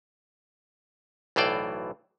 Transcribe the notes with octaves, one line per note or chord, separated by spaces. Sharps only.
B1 A2 E3 C5 D5